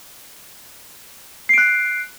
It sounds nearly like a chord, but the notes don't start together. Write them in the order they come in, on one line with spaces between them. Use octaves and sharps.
C7 D7 F#6